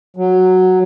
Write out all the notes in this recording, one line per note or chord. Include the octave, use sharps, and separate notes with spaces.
F#3